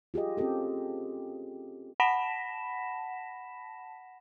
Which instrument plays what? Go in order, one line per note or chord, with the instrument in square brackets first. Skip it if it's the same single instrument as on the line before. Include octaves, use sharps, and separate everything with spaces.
[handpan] F4 G4 G#4 D#5
C4 C#4 F4 G4 A4
[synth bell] F#5 A5 B5 A#6 B6 E7